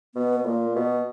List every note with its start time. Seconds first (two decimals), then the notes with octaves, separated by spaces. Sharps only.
0.15 B2 B3
0.46 A#2 A#3
0.76 B2 B3